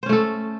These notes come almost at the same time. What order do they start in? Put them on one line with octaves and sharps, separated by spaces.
C5 C#4 A3 A4